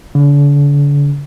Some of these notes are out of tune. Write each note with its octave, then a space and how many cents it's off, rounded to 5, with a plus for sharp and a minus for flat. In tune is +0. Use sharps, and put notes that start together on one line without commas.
D3 -40